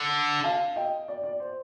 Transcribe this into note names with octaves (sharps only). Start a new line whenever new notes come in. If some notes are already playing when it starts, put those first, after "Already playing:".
Already playing: D3
F5 A5
D#5 G5
D5
D5
C5